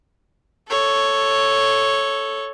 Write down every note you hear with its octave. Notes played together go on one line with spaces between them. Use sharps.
A4 C#5